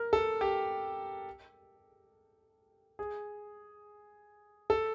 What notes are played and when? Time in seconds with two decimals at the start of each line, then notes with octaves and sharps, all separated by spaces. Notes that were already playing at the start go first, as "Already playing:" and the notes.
Already playing: A#4
0.13 A4
0.41 G4
2.99 G#4
4.70 A4